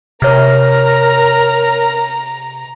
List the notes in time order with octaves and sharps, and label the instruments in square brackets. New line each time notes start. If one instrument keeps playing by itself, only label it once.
[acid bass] C3 [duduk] A#4 [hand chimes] C#5 F6 [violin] A#5